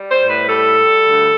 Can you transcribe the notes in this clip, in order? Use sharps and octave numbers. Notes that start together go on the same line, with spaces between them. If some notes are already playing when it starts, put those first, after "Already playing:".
Already playing: G3
C5
A2
B4
G3 A4
G3
D2